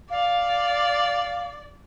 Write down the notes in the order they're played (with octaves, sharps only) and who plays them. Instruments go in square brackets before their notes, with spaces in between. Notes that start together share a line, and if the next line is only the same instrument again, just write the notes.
[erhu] D5 [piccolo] F5